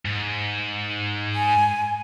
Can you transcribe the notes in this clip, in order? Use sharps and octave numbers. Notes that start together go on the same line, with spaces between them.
G#2
G#5